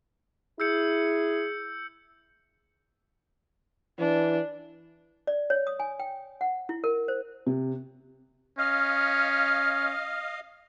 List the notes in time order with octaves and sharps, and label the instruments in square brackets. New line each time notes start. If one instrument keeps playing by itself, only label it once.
[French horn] E4 [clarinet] G#4 [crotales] E6 G6 C#7
[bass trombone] E3 [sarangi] D4
[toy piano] D5
C#5
D#6
G#5
G5
F#5
E4
A#4
C5
[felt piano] C3
[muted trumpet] C#4 [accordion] D#5 F5 [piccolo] F6